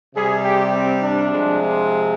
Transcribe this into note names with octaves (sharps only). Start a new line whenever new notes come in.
C3 G3 G#4
G4
C4
D4
C3 F3 G#3